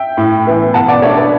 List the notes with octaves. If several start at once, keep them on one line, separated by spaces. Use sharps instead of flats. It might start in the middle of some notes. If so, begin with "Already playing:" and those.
Already playing: E5 G5
A2
E3 B3 E4
B2 F#5 A5
D5 F#5
A3 D4 C#5 E5
B4 D5